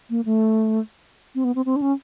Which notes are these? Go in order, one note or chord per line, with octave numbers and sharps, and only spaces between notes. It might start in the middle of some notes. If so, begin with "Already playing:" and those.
A#3
A3
C4
B3
C4
C4
D4
C#4